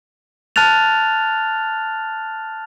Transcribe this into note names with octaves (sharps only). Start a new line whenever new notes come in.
A5 F6 F#6 A6 F7